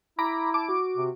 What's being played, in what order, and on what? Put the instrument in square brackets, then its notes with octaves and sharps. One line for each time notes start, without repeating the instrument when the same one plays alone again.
[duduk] E4 [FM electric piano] A#5 B5 D6
[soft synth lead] A5 [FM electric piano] D6
[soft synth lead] F#4
[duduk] C3